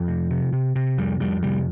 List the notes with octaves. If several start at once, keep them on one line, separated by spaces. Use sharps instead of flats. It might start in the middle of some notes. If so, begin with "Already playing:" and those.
Already playing: F2 F3
C3
C3
C3
C3
F2 G3
F2 G3
C3 G3